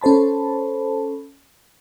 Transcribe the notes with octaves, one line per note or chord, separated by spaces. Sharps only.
C#4 A4 C5 A5 B5